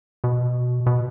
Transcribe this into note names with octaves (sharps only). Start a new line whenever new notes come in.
B2
B2